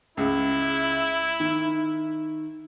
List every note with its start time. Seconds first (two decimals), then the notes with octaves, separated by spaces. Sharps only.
0.17 C#2 E4
1.40 D#3